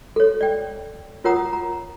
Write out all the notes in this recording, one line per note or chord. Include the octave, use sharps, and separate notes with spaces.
A4 C#5
D5 G5
F4 A#4 C#5 F#5 A#5 D#6
A#5